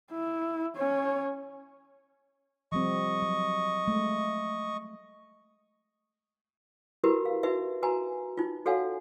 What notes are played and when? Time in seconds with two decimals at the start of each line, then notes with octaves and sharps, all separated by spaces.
0.12 E4
0.77 C#4 C#5
2.72 F3 G3 C4 D#5 C#6
3.22 F#3
3.88 G#3 A3
7.04 E4 F#4 G4 A#4 B4
7.25 F5
7.43 D#4 F#4 B4 E5
7.83 F#4 B4 G#5 A#5
8.37 D#4 F4
8.66 F#4 A4 C#5 F5 F#5 G#5